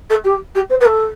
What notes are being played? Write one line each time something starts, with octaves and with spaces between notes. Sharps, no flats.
A4
G4
G4
C5
B4
A4